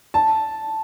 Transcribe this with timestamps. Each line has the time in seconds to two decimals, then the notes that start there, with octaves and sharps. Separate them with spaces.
0.14 A5